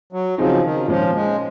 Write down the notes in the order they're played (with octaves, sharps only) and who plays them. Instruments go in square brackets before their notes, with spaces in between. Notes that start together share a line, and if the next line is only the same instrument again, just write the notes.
[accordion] F#3
[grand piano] C#3 F#3 C4 D#4 G#4 [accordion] F3
[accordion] D#3
[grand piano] A#2 G#3 C#4 G#4 [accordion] F3
[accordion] G#3